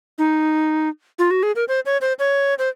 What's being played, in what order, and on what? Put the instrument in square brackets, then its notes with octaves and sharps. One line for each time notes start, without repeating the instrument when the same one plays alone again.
[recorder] D#4
F4
F#4
G#4
A#4
C5
C#5
C5
C#5
C5